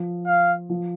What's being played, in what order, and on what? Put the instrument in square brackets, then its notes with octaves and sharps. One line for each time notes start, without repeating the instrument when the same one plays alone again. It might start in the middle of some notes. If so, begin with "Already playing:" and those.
Already playing: [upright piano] F3
[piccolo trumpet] F5
[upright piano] F3